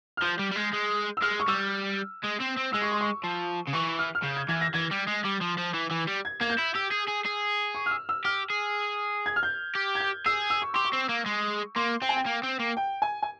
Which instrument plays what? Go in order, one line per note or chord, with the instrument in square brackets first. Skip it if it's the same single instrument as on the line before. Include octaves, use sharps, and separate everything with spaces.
[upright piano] F6
[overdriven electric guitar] F3 [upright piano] G6
[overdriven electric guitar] G3
G3
G#3
G#3
[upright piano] E6
[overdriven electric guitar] G#3 [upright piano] F6
[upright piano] C#6
[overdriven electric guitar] G3 [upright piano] E6
[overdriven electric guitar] G#3
C4
C4
[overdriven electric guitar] G#3 [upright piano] E6
[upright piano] C#6
C6
C#6
[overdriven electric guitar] F3
C#3
[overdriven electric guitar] E3 [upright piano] C#6
[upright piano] F6
F6
[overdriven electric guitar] C#3 [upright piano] G6
[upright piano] G#6
[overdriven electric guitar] E3 [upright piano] G#6
[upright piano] A#6
[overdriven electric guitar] E3 [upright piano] G#6
[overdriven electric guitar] G3
G#3
G3
F3
F3
E3
E3
G3
[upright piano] G#6
[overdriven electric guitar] A#3 [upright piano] G#6
[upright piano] G6
[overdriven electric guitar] E4
[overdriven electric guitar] G4 [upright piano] E6
[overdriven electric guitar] G#4
G#4
G#4
[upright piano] C#6
F6
E6
E6
[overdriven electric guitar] G4 [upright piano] F6
[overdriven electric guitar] G#4
[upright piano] G#6
F6
G6
[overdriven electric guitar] G4
[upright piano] G#6
G6
[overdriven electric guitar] G#4 [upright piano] E6
[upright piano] E6
C#6
[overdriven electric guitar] G4 [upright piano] C6
[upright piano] C#6
[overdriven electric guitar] C4
A#3
G#3
[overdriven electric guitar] A#3 [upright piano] C6
[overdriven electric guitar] C4 [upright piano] G5
[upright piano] G#5
G5
[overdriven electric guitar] A#3
C4
A#3
[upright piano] G5
G#5
G#5